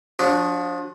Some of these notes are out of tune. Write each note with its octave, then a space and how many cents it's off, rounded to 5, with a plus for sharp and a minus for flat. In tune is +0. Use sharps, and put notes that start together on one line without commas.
F3 +25 D4 -20 F#4 +0